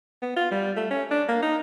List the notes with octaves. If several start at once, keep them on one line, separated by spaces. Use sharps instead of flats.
B3
F4
G3
A3
C#4
D4
A#3
D#4